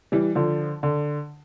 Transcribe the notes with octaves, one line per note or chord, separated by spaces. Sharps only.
E3 G3
D3 F3
D3